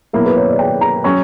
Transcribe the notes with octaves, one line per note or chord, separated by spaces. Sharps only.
B2 F#3 A#3 E4 A#4
B4
C#5
D5
G5
A#5
F#3 C#4 C#6